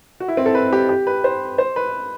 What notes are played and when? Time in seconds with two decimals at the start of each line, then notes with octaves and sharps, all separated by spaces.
0.20 F#4
0.28 E4
0.37 C4
0.46 A4
0.55 B4
0.73 G4
0.89 G4
1.07 B4
1.24 C5
1.58 C5
1.76 B4